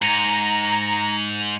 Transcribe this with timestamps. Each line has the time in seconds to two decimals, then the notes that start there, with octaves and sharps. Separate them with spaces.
0.02 G#2 A#5 C#7 D#7 F7